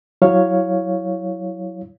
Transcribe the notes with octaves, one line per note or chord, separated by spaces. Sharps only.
F#3 E4 C#5 F5